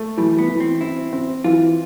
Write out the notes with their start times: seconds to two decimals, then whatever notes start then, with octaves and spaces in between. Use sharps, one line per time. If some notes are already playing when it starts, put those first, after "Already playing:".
Already playing: A3
0.17 E3 G3
0.38 B3
0.49 E3
0.60 C4
0.81 C4 E4
1.13 C4
1.44 E3 F4